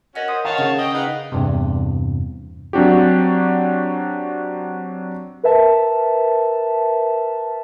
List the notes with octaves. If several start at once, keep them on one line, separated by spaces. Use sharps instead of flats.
C#4 F#4 A#4 D#5 F#5
C5 D#6 G6
D#3 C#5 F5 F#5 A5
C#3 F#5 C#6
G#4 D#5 G5
D#4 B4 F5 F#5
E2 G2 C3
F#3 C4 D4 F#4 G4
A#4 B4 E5 A5